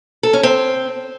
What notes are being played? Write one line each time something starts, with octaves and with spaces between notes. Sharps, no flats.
A4
C#4
C4